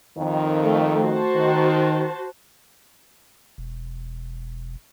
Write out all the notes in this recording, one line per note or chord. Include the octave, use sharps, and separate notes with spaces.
F2 D#3
A3
F#4 C5 A5
D#3
E1